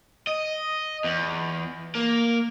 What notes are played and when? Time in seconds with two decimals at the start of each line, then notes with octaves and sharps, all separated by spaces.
0.27 D#5
1.04 E2
1.95 A#3